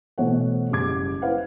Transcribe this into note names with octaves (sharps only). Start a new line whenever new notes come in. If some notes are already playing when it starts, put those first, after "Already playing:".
B2 E3 A3 C5 C#5 F#5
F#1 C#3 G3 D6 G#6
E4 B4 C5 F5 F#5